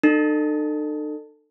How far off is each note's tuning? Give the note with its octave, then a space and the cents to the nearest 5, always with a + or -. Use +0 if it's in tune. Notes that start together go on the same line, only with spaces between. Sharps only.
D#4 -45 A4 +20